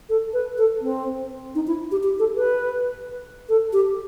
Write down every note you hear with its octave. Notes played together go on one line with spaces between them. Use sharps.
A4
B4
A4
C4
D#4
E4
G4
G4
A4
B4
A4
G4